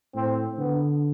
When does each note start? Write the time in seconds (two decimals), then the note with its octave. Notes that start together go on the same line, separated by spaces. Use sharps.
0.15 A2 C4
0.58 D3 B3